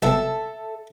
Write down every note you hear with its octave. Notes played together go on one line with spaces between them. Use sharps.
C2 B2 C4 A4 E5